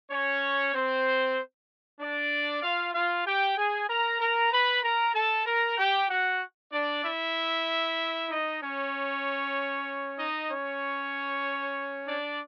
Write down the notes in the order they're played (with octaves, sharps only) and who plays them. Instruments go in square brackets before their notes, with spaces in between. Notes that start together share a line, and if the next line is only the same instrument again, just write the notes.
[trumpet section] C#4 C#5
C4 C5
D4 D5
F4 F5
F4 F5
G4 G5
G#4 G#5
A#4 A#5
A#4 A#5
B4 B5
A#4 A#5
A4 A5
A#4 A#5
G4 G5
F#4 F#5
D4 D5
E4 E5
D#4 D#5
C#4 C#5
D#4 D#5
C#4 C#5
D4 D5